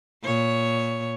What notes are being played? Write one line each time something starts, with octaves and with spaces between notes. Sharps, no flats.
A#2 C#5